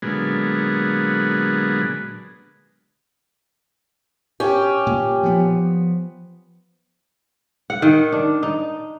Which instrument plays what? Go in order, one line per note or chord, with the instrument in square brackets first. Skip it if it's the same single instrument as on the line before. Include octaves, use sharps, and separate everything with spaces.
[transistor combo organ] A#2 D3 F#3 G#3 B3
[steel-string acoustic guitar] C#4 G4
[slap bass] A#2
F3 B3
[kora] F#5
D#3
D4
D#4